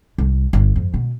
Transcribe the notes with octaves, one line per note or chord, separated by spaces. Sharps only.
C2
G1
F2
B2